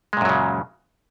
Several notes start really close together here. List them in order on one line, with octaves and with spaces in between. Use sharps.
G#3 A#2 F#2 F#3 C#3